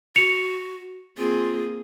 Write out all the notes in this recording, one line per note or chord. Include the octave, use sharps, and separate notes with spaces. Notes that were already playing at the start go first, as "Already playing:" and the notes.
F#4 C#7 F7
A#3 C4 F4 G#4